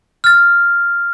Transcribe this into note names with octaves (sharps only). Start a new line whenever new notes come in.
F6 A6